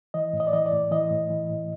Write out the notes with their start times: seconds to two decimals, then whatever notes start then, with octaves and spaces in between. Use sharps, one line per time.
0.14 E3 D#5
0.33 A2
0.40 D#5
0.47 D5
0.53 E3 D#5
0.66 D5
0.72 A2
0.91 E3 D#5
1.11 A2
1.30 E3
1.50 A2